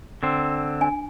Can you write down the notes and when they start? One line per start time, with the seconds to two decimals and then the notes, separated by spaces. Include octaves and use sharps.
0.23 D3 C4
0.81 D4 G#5